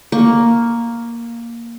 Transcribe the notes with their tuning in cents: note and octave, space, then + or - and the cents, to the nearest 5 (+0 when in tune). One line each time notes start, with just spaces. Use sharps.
A#3 +0 C#6 +0